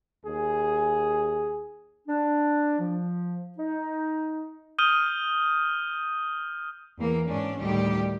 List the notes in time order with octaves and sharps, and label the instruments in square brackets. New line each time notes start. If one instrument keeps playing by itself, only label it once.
[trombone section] D#2 G#4
[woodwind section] D4
F3
D#4
[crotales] D#6 F6 G6 D#7 G7
[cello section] E2 E3 A#3
G#2 C#4 D4
D2 A2 D#3 G3 G4